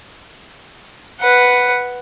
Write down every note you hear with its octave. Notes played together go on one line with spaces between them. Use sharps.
B4 F#5